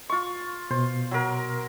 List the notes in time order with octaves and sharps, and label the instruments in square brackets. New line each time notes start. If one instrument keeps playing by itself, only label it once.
[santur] F4 C#6
[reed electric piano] B2 [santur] C5
[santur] F#3 A#4